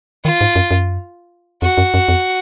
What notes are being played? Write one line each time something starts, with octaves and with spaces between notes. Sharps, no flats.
D#3 F4
G#2
F#2
F#2
F2 F#4
F#2
F#2
F2